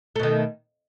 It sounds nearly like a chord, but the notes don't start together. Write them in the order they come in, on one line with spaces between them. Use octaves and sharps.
A3 B2 D#3